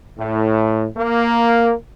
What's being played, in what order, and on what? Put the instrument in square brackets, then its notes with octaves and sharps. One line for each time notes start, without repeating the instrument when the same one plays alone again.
[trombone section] A2
A#3